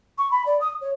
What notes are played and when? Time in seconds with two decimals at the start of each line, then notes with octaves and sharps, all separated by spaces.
0.18 C#6
0.31 B5
0.46 D5
0.61 D#6
0.81 C#5